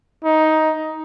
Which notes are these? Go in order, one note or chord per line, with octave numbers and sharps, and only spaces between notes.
D#4